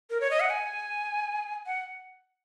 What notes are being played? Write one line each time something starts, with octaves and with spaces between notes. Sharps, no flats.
A#4
C#5
D#5
F#5
G#5
F#5